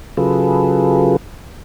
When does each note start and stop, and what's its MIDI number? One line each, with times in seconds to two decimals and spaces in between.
0.17 1.17 49
0.17 1.17 54
0.17 1.17 65
0.17 1.17 68
0.17 1.17 69
0.17 1.17 71